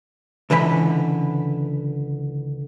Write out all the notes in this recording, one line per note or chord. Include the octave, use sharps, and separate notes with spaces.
C#2 D3 E3 D#5 B5